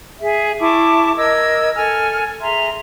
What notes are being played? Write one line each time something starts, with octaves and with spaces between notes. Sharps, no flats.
G#4 E5
E4 A5 C#6 D6
A#4 D#5 E6 G#6
A4 G#5 F6
G#4 E5 A#5 C6